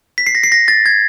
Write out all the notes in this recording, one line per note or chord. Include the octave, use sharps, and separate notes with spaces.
B6
C7
A#6
C7
A#6
A6
G#6